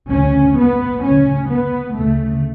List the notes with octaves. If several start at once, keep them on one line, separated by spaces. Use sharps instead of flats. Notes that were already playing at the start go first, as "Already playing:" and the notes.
D2 C#3 C#4
B3
D2 C#3 C#4
B3
D2 C#3 A3